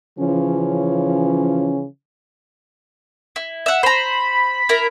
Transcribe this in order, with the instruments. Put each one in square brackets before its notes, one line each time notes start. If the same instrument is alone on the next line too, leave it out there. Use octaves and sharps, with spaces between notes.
[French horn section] C#3 E3 F3 C#4
[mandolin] E4
E5 F#5
[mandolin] C5 A#5 [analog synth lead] B5
[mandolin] E4 A#4